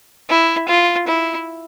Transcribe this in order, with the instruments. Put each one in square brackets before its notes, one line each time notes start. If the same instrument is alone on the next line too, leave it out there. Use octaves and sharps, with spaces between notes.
[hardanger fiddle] E4
F4
E4